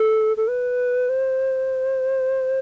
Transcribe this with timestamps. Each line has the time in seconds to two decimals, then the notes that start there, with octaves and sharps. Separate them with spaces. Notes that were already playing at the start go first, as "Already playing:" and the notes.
Already playing: A4
0.37 A4
0.48 B4
1.09 C5